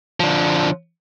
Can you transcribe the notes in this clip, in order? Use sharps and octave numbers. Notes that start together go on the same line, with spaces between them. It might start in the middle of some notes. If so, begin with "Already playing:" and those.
D3 F3